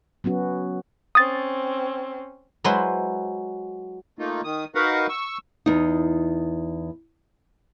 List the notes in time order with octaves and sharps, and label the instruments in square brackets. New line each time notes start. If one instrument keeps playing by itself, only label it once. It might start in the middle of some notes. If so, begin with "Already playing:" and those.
[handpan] F#3 B3 C#4 F#4
[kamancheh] C4 C#4 [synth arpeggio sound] D#6 A6
[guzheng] F#3 G#3 E4 B4 C5 C6
[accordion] A3 A#3 D#4 F4
D#3 D#6
D#4 F#4 A#4 B4 F5 F#5
C#6 E6
[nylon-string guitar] E2 D#4